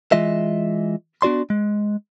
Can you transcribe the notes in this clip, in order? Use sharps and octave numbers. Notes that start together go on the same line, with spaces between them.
E3 G#3 F4 D#5 E5
B3 D4 F#4 D5 C6
G#3